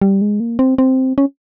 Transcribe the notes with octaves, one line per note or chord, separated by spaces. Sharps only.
G3
G#3
A#3
C4
C4
C#4